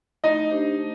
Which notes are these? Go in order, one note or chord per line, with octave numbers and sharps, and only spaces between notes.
A3 D#4 D#5
D4 G4 C5
A3